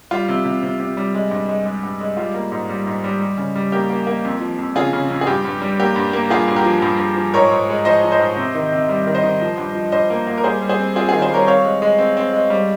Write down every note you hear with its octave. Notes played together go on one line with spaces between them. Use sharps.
G3 F4
C3
C3
C3
C3
G3
G#3
G2
G#3
G#3
G2
G#3
G3 F4
A#3
G#2
G3
G#2
G3
G3
C#3
G3
A#3 G4
A#3
A#3
F2
F3
F2
C#3 F4 G#4
C#3
F2
G#4
G2 G4
G2
G3
A#3 G4
G2
A#3
G2 F4 G#4
G2
G4 A#4
F3
G2
G2
F3
G#2 A#4 C#5
G#2
G#3
F3 C5 D#5
F3
C5 D#5
G#2
C3
D#3
C3
G3
D#3
C5 D#5
D#3
F3
G2
F3
G2 C5 D#5
A#3
A#3
A#4
G3 G#4 C5
G3
G#4 C5
C4
C4 F4 G#4
F4 G#4
D#3
G#4 C5
G3 A#4 C#5
C4 C#5 F5
G#3
G#3
C4
C4
G#3
G3